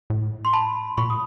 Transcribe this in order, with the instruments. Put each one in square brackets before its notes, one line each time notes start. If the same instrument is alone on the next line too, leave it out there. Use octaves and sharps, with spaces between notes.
[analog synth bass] A2
[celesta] C6
A5 B5
[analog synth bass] A#2 [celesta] B5 C#6
[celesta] D#6